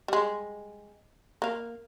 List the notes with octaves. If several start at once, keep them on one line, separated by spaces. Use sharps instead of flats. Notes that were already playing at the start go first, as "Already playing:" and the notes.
G3 G#3
A#3 F5